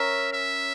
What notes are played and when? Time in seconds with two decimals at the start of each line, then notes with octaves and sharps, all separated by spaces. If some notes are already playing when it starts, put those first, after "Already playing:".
Already playing: C#4 A#4 E5
0.33 E5